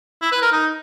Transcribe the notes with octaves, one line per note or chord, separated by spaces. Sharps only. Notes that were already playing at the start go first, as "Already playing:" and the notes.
E4
B4
A#4
D#4